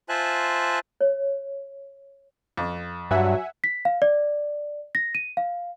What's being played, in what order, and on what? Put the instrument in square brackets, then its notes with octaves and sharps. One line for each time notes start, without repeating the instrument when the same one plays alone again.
[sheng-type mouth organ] F4 C5 E5 G#5 A5 F#6
[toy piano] C#5
[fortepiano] F2
[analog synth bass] G2 [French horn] F#3 [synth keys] E5 F#5 G#5
[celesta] B6
F5
D5
A#6
D#7
F5